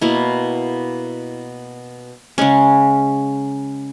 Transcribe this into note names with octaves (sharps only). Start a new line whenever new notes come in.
B2 A#3 E4
C#3 G#3 C#4